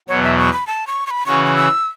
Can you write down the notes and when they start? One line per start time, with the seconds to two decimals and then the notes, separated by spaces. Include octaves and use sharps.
0.08 E2 B2 F#3 C#5
0.23 E5
0.38 C#6
0.53 B5
0.67 A5
0.87 C#6
1.07 C#6
1.10 B5
1.26 C#3 E3 C#4 F#4 C#6
1.45 C#6
1.56 E6